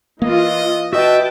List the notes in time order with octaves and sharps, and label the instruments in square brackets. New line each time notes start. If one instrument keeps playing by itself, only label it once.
[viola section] E3 F4 [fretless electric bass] A#3 [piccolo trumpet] D#5
[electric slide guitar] F#4 D#5 [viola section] B4 G5 A5 [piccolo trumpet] E5